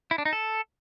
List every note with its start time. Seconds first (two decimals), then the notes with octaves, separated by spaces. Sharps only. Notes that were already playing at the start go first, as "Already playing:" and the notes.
0.11 E4
0.18 D4
0.25 D#4
0.33 A4